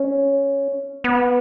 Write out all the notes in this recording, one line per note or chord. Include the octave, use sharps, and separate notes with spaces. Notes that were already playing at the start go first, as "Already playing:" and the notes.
Already playing: C#4
B3